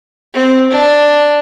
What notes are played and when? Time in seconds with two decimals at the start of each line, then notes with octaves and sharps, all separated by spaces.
0.34 C4
0.71 D4